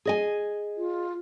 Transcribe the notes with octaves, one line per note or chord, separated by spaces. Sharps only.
G#4 D#5 G#5
F4